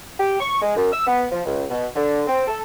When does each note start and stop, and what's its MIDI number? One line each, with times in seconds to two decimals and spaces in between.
0.19 0.40 67
0.41 0.61 85
0.62 0.74 56
0.76 0.90 42
0.92 1.04 88
1.07 1.26 59
1.32 1.40 53
1.46 1.65 37
1.70 1.88 47
1.96 2.23 50
2.28 2.45 60
2.48 2.61 69